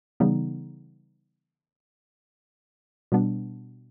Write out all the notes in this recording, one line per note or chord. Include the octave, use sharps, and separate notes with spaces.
C#3 E3 G3 B3 D#4
B2 G3 B3 D4